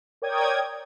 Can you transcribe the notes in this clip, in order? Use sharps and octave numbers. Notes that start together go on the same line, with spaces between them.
A#4 C#5 D5 G5 D#6 G#6